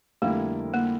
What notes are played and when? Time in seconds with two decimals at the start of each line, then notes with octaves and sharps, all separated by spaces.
0.22 F2 D3 G3 A3 A#3 E4
0.74 A#3